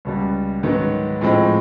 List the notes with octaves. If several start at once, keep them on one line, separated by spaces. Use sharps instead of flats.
C#2 B2 G3
G#2 D#3 F#3 B3
A2 F3 G#3 C4